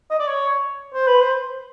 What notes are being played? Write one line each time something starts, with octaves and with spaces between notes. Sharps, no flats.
D#5
D5
C#5
C5
B4
C5